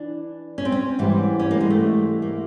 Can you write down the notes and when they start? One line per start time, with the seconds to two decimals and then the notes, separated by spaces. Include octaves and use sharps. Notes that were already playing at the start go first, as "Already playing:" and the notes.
Already playing: E3 D4
0.58 C#4
0.65 C4
0.72 C#4
0.99 G#2 E3 G3
1.40 C#4
1.51 A#3
1.61 G#3
1.70 A3
2.22 A#3